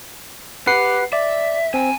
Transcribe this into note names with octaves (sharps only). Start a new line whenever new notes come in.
G4 B4 F#5 C7
D5 E5
C4 F#5 G#5